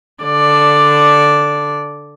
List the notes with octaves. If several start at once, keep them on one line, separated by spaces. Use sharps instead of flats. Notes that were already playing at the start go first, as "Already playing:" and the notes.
D3 D5